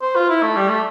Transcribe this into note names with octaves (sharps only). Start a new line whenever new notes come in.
C5
F4
E4
A3
G3
A3